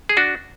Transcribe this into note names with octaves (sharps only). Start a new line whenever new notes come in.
G#4
D4 F#4